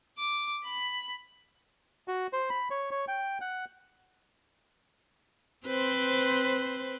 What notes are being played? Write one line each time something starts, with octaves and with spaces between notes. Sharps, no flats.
D6
B5
F#4
C5
B5
C#5
C#5
G5
F#5
C4 B4 C5